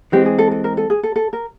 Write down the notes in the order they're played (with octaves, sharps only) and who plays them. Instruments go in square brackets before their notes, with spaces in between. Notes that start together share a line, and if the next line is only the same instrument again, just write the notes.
[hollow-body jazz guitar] E3 G#3 C4 [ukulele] G4
[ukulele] G#4
A4
A4
A#4
A4
G#4
A4
A4
A#4